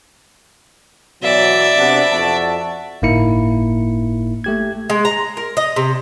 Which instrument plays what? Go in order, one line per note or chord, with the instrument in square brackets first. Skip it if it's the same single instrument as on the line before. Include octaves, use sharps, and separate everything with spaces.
[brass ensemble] B2 E3 F#3 [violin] D5 E5
[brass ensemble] C3 B3 D4
F2 F#4 A5
[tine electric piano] G1 A2 A#3 D#4 E4 C#7
A3 G4 G#6
[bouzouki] G#3
A#5
A#4
D#5
C3